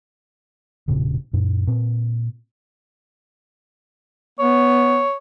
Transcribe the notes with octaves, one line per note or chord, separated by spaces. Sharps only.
E1 A#2 C#3
F#2 A#2
A#2 C4
B3 C#5